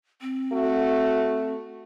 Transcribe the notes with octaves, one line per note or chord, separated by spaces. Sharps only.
C4
A3 F#4